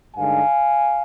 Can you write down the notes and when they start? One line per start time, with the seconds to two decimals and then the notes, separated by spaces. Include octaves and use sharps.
0.16 G2 D3 G#3 D#4 F5 G#5